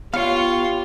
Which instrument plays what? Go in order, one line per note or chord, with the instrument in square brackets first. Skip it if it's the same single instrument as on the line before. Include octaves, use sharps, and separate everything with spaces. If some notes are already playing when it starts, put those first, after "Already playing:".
[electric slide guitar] B3 C#5 [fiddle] F4 [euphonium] G4 [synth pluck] F5